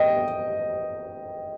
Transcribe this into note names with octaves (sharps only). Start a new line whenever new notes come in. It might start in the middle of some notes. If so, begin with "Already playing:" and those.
Already playing: D#5 G5